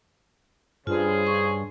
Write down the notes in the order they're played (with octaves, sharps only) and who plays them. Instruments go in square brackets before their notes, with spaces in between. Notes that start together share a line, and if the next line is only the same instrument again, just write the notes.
[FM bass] G2 [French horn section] C#3 G#4 C5 [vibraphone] F4
[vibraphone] C#6